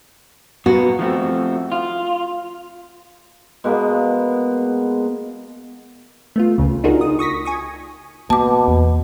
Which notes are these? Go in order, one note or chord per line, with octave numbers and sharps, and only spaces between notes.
B2 A#3 B3 F#4
F3 A3 C4
F4
B2 G#3 A#3 B3
A3 B3 F4
C#2 C#3
D4 D#4 F4 F#4 G#4 A#4
D#6
C#6 D#6 A#6 B6
G#5 C#6 D#6
B2 A#3 A5 D6
E2